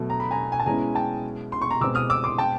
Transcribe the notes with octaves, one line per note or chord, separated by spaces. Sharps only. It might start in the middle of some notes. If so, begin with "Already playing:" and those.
Already playing: B2 F#3 A3
A#5
B5
G#5 A#5
G#5
A5
B2 G#3 C#4 E4 G#5 A#5
G5 A5
C6
C#6
A#5 C6
B2 G#3 C4 D6 E6
D#6 F6
D6 E6
C6 D6
G5 A5